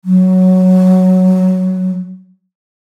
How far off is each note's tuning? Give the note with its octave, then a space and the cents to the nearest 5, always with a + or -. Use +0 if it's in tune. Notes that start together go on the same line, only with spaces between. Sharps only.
F#3 +0